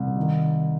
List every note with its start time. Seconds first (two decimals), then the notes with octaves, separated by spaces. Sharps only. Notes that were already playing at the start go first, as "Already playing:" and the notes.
Already playing: C2
0.17 D#3